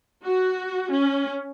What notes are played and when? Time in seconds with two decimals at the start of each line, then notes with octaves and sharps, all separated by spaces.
0.23 F#4
0.93 C#4